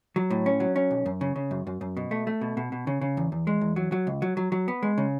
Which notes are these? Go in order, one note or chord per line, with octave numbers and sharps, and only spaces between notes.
F#3
A2
C#4
F#3
C#4
B1
F#2
C#3
C#3
F#2
F#2
F#2
B2
A3
A3
B2
B2
B2
C#3
C#3
E2
E2
G#3
E2
F#3
F#3
C#2
F#3
F#3
F#3
B3
G#3
C#3